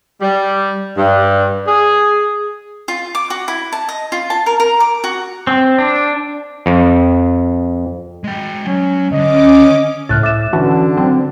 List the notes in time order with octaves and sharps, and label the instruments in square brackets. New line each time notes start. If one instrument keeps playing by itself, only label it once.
[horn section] G3
G2
G#4
[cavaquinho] F4
D6
F#4
E4
A5
D#5
F4
A5
A#4
A#4
D6
F#4
[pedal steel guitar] C4
D4
[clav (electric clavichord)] F2
[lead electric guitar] G#3 G5
[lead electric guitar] F#3 [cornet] C#4
[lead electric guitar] D3 [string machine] C#4 D6 [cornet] D#5
[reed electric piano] C#2 [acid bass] A2 [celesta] F6 F#6 A6
[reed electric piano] E5 [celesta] D6 A6 E7
[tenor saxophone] D3 [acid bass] E3 [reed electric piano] C#4 F#4 [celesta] A5
[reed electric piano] F#3 [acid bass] C4